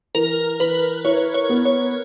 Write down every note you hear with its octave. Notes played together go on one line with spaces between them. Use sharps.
E3 A#4
E3 B4
E4 C#5
C#5
B3
C#5